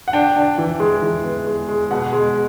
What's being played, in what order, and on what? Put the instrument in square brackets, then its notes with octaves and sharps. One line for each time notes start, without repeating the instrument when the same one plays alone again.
[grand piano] F#5
D4 G5
D4
E3
G#3
E3
B3
G#3
G#3
B2 F#5
G#3